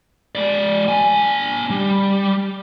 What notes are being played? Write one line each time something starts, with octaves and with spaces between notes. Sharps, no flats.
G#3 D5
D4 G#5
G3